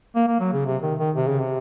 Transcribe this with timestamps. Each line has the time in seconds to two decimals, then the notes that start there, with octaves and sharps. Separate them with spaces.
0.16 A#3
0.27 A#3
0.40 F#3
0.53 C#3
0.66 C3
0.82 D#3
0.99 D#3
1.15 C3
1.28 C#3
1.41 C3